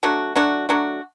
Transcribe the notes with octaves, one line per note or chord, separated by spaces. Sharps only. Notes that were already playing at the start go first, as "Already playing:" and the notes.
F#3 A3 D4 F#4
F#3 A3 D4 F#4
F#3 A3 D4 F#4